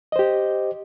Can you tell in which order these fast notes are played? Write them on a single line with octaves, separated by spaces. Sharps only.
D#5 C5 G4